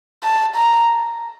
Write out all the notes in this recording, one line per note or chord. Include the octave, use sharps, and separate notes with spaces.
A5
A#5